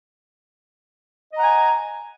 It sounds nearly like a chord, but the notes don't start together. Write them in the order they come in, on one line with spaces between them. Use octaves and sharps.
D#5 A#5 F#5 G#5